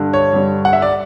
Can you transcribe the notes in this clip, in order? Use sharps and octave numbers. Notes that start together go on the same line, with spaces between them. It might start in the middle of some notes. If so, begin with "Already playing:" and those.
Already playing: G2 D3 G3
C#5
G2 D3 G3
F#5
E5
D5